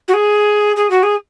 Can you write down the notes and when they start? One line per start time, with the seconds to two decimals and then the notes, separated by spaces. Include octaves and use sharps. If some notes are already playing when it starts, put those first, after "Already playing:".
0.08 F#4
0.14 G#4
0.76 G#4
0.90 F#4
1.03 G#4